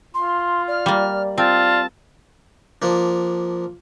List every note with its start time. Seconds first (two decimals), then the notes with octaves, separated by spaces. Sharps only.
0.14 F4 C6
0.68 D5 F6
0.86 G3 A#3
1.38 C4 F4 A5
2.82 F3 A#3 D4